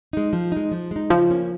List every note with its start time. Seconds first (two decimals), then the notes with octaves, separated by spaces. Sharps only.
0.13 G#3 D#4
0.33 F3
0.52 G#3 D#4
0.72 F3
0.91 G#3 D#4
1.10 C#3 F3
1.30 A#3 C#4